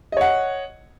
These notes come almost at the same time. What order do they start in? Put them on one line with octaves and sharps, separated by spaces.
D#5 C#5 F#5